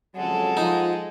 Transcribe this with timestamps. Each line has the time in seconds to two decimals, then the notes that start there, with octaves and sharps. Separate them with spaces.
0.16 F2 C#3 F#3 G#3 A4 F#5
0.57 F3 D#4